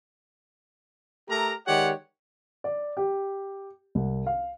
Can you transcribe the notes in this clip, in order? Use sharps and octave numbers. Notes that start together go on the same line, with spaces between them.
A3 G4 A4 A#4 A#5
D#3 G#3 G4 C#5 D5 F#5
D5
G4
C2
F5